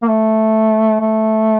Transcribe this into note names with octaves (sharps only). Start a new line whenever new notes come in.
A#3
A3
A3